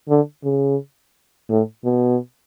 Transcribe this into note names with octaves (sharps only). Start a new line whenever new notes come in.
D3
C#3
A2
B2